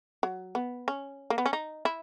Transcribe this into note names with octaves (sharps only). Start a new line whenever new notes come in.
F#3
B3
C#4
A#3
B3
C#4
D#4
E4